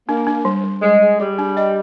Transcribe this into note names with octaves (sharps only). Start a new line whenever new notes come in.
A#3 D4
D4
G3
G3
G3 G#3
G#4
G3 G#4
D4
D#5